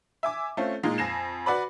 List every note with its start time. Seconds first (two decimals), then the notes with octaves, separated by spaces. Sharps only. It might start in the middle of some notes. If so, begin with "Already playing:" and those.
0.23 E5 G#5 D6
0.57 A3 C4 C#4 F4
0.83 A#2 G#3 D#4
0.98 F2 G#5 A#6 C7 E7
1.46 F#4 B4 D5 B5